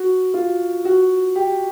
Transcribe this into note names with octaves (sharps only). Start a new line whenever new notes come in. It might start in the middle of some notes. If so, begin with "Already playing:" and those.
Already playing: F#4
F4
F#4
G4